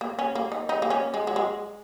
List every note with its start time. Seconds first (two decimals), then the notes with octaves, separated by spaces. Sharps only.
0.01 A#3
0.19 C#4
0.35 A#3
0.52 D#4
0.69 D#4
0.82 A#3
0.90 C#4
1.14 G#3
1.27 F#3
1.36 G#3